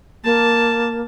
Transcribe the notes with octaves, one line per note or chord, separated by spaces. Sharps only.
A#3 A5